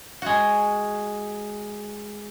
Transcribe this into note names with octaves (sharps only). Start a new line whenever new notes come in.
G#3 F#4